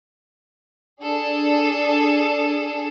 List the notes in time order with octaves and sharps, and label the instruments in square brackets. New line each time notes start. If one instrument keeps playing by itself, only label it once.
[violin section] D4 G#4 A4